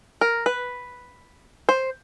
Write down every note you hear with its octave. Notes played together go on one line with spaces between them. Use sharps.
A#4
B4
C5